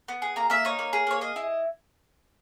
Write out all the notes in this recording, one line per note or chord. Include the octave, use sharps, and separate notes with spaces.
B3
G#4
A#3 A#5
A#3 E5
D#4 C#5
A#3
G#4
A#3 C#5
G#4 D#5
E4